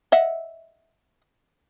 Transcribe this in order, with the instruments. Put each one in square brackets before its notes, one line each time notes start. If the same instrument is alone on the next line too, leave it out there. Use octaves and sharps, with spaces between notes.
[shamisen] D#5 E5 F#5